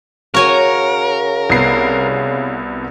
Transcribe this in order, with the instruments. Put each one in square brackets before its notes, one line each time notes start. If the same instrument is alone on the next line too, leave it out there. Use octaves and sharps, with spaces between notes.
[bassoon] C#3 [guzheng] F#4 C#5 G#5 [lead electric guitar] A#4
[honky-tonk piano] C2 B3 C7